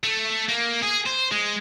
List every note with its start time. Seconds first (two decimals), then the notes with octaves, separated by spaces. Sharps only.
0.04 A3
0.49 A#3
0.83 G#4
1.06 C5
1.32 G#3